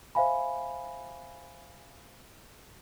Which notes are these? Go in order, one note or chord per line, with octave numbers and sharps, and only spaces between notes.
C5 E5 F5 G#5 B5